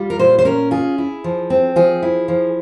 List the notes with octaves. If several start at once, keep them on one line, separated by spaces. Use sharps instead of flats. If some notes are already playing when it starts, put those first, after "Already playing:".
Already playing: G3 F4
A#4
A#2 C5
C5
C#4 A#4
F4 G#4
E4
F3
C4
F3 G#4
E4
F3